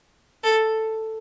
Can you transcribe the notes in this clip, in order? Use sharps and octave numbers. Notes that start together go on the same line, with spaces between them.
A4